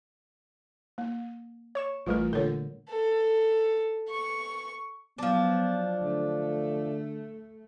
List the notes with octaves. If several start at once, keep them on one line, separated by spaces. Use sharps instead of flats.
A#3
C#5 C#6 E7
A1 E3 G3 A3 F4 A#4
A#2 D3 A#4 C#5
A4
C#6
F3 F#3 B3 D4
D3 A3